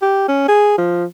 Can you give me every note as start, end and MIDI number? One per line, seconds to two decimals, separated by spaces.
0.02 0.27 67
0.28 0.47 61
0.48 0.77 68
0.78 1.05 53